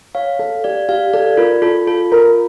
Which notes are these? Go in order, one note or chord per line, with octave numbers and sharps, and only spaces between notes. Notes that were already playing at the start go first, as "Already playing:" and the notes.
C#5 F5
A4 F5
G4 D5
G4 F5
A4 D5
F4 A#4
F4 A4
F4 A4
F4 A#4